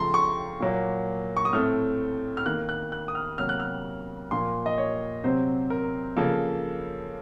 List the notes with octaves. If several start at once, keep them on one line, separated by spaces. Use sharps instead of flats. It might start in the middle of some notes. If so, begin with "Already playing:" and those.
Already playing: C#3 F3 A3 A#5 C6
C#6
A#2 F#3 A#3
C#6
D#6
A2 A3 C4 F6
F6
D#3 A#3 F#6
F#6
F#6
D#6
F6
C3 F#3 A#3 F6
F#6
F6
A#2 F3 A#3 C6
D#5
C#5
C3 F#3 C4 C5
A#4
C#3 F3 A#3 A4